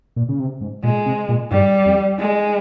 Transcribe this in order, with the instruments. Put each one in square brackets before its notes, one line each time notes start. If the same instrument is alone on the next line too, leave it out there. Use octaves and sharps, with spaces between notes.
[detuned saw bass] A#2
C#3
C3
G#2
[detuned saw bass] A#2 [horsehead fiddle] G#3
[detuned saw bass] C3
A#2
[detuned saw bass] G2 [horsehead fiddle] G3
[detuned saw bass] F2
[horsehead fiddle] G#3